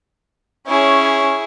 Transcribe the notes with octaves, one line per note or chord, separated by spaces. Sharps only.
C#4 E4 G#4 C#5